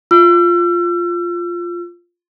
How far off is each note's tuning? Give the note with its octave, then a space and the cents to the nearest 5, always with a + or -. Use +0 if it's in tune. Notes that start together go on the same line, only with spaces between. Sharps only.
F4 +0 E6 +40